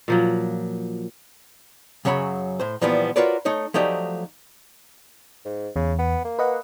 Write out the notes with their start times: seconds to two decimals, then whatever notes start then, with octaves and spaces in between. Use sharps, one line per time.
0.08 A#2 F3 F#3
2.05 F#2 C#3 F#3 C#5 B5
2.60 A2 C5
2.82 A#2 E3 F3 G3 B3
3.16 F4 F#4 A#4 B4 C#5 D5
3.45 A3 D#4 C#5
3.74 F3 F#3 A3 D#4 G4 D5
5.45 G#2
5.76 E2 C#3
5.98 B3
6.25 A#3
6.39 B4 D#5 F#5